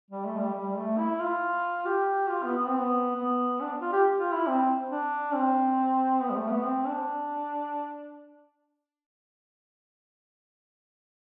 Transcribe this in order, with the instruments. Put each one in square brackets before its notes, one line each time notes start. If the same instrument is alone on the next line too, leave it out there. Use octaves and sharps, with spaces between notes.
[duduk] G3
A3
G3
G3
A3
E4
F4
G4
F4
B3
B3
C4
B3
B3
D4
F4
G4
F4
E4
C4
D4
C4
B3
G3
A3
B3
C4
D4